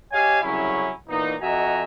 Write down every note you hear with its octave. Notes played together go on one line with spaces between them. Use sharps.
G4 C#5 D#5 F5 G#5
C2 C#3 F#3 C#4 E4
A#2 E3 B3 D#4
F2 F#4 D#5 E5 G#5 A#5